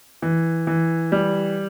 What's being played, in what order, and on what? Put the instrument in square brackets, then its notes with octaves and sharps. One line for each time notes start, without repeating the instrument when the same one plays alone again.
[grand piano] E3
E3
G3